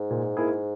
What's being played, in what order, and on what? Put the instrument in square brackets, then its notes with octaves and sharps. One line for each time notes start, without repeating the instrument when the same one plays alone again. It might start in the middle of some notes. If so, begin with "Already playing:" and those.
Already playing: [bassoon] G#2
[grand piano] A#2
A#3 E4 G#4